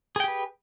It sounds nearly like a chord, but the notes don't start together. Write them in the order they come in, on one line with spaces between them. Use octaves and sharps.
G#4 G5 G4 B4